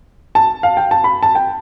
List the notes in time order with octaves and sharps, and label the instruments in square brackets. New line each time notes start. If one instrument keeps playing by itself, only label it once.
[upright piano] A5
F5
G5
A5
B5
A5
G5